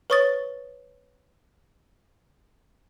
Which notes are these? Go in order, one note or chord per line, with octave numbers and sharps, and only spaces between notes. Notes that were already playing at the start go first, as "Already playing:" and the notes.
B4 C#5 C#6 D#6 A6